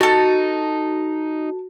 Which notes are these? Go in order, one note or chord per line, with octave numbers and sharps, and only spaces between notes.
D#4 F#4 A4 A5